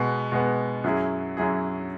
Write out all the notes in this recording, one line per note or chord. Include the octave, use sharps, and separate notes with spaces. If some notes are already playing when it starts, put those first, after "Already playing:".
Already playing: B2 G#3 B3
B2 G#3 B3
F#2 F#3 E4 G#4
F#2 F#3 E4 G#4